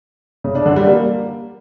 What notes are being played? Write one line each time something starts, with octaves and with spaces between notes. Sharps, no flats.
C#3
D4
D3
G3
A#3